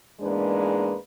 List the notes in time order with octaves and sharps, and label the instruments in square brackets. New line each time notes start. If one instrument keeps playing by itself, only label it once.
[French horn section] E2 G#2 G#3 A#3 D4 B4